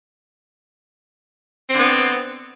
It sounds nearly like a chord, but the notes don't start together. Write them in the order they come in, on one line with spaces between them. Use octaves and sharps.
C4 D3 B3